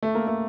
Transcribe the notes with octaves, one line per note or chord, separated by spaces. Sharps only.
A3
A#3
A3